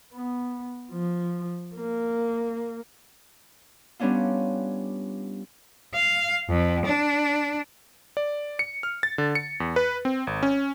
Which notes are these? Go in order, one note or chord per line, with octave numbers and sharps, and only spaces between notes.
B3
F3
A#3
G3 B3 C#4 D4 F4
F5
F2
D4
D5
C#7
F6
A6
D3
C#7
E2
B4
C4
G#1
C#4